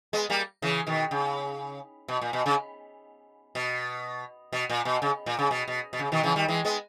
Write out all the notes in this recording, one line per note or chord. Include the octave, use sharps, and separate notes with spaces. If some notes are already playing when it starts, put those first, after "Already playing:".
G#3 B3
G3 A#3
C#3 E3
B2 D#3
C#3
B2
A#2
B2
C#3
B2
B2
A#2
B2
C#3
A#2
C#3
B2
B2
B2
C#3
B2 D#3
C#3 E3
D#3 G3
E3 G#3
G#3 B3